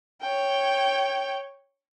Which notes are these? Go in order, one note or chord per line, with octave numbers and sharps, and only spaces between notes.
C#5 G5